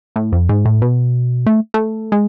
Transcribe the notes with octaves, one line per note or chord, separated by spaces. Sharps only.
A2
F2
G#2
A2
B2
A3
A3
G#3